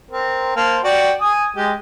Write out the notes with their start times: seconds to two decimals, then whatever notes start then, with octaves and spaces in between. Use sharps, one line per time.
0.10 C4 A#4
0.56 A#3 C5 A5
0.84 F#4 D5 G5
1.21 G#5 D#6
1.56 G#3 G4